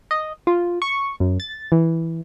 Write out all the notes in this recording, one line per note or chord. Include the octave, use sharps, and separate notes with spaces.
D#5
F4
C#6
F#2
A6
E3